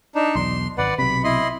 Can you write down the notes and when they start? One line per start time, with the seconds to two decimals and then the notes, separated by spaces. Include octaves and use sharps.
0.15 D4 D#4
0.35 B1 E2 C6
0.78 G#1 B4 D5 F#5
0.98 B1 C3 B5
1.24 E4 D#5 C6